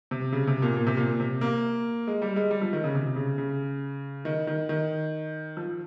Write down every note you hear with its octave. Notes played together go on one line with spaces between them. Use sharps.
C3
C#3
C3
A#2
A#2
C3
A#2
C3
A#3
G#3
G3
G#3
G3
F3
D#3
C#3
C3
C#3
C#3
D#3
D#3
D#3
F3